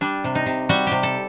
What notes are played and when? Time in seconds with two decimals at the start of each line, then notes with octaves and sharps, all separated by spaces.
0.01 G3 D4
0.24 C3
0.35 D#4
0.46 C3
0.69 G3 F#4
0.87 C3 G4
1.03 A4